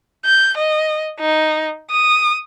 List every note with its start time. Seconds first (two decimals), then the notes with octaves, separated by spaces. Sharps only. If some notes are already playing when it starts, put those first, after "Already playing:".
0.25 G6
0.58 D#5
1.20 D#4
1.91 D#6